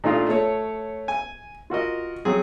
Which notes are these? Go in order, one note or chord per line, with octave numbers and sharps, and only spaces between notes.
A#2 A3 D4 D#4 F4 F5
A3 C#5
G#5
F4 F#4 A#4 D#5
F#3 C4 G#4